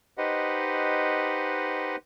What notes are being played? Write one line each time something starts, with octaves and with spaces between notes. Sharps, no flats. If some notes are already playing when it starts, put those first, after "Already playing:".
D#4 G4 B4 C5 D#5 F#5